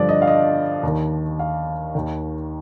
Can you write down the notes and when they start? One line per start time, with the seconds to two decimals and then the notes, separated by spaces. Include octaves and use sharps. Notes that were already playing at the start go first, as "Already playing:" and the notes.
Already playing: G2 D3 F3 D5
0.09 D#5
0.22 F5
0.28 D#5
0.83 D#2 D#3
1.39 F5
1.95 D#2 D#3